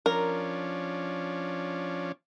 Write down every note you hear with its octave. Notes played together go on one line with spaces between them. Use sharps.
F3 C#4 D4 A#4